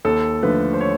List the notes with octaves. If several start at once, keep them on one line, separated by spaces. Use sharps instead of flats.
D#2 A4
D3 F3 A3 B4
C5
C#5